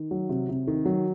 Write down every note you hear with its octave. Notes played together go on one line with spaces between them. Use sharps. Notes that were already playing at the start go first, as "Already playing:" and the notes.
Already playing: D#3
F#3
C3
C3
D#3
F#3